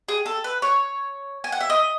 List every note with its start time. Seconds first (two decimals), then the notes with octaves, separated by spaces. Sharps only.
0.08 G#4
0.26 A4
0.44 B4
0.62 C#5
1.44 G#5
1.52 F#5
1.60 E5
1.70 D#5